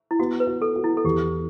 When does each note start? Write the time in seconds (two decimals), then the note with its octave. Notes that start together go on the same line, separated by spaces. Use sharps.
0.11 E4
0.19 B3 F#4
0.40 B4
0.47 F#4
0.62 A4
0.76 F#4
0.84 E4
0.97 A4
1.04 E2 G4